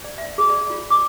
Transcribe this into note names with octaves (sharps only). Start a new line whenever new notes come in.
D5
E5
G#4
D5
F4
D6